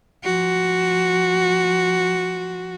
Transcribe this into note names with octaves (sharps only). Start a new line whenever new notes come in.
F3 F#4